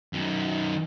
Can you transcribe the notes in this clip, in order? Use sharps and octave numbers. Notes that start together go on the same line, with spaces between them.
F#2 D#3